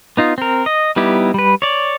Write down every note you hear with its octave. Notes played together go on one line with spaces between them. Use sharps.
B3 D#4 F4
C4 A#4
D#5
G3 B3 D#4 E4 G4
G3 B4
C#5 D5